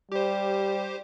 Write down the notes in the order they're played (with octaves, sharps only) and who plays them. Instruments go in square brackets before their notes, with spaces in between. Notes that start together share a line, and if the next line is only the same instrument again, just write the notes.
[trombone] G3 [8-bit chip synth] G4 C5